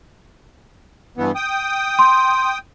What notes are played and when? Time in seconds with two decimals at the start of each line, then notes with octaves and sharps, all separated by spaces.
1.17 G2 E3 B3
1.35 G5 D#6
1.99 C6